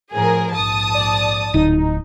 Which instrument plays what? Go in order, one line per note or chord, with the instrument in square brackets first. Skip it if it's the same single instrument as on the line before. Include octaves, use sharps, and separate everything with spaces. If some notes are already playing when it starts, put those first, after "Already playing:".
[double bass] A2 F3 [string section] G#4 A#4
[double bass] A#1 G#2 [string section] A5 D#6
[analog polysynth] D5
[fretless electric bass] D1 [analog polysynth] D#4